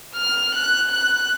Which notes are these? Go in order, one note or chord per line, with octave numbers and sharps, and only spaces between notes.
F6
F#6
F#6